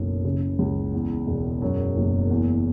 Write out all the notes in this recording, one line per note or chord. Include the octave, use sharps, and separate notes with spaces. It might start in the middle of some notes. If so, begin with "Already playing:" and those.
Already playing: F#1 B1 F#2
C#3
C#2
E2
E1
F#2
F#1
E2